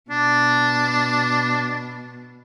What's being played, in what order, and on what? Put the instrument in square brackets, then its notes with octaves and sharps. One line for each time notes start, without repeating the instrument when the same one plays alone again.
[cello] B2 [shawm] D4